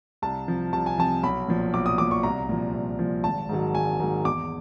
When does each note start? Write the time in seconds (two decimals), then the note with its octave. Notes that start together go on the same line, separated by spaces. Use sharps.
0.22 C2 A5
0.48 C3 F3
0.73 C2 A5
0.86 G#5
0.98 C3 F3 A5
1.23 B1 B5
1.48 A#2 F3
1.74 B1 D6
1.86 D#6
1.98 A#2 F3 D6
2.11 C#6
2.23 C2 A#5
2.49 A#2 F3
2.74 C2
2.99 A#2 F3
3.24 G#1 A5
3.49 G#2 D#3 F#3
3.75 G#1 G#5
4.00 G#2 D#3 F#3
4.25 E2 D6